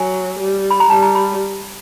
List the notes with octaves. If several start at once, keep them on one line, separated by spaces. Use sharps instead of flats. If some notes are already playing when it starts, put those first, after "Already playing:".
Already playing: F#3 G#5
G3
B5
A#5
G3 A5
A#5
B5